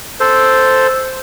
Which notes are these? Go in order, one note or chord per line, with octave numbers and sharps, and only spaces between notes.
A4 C5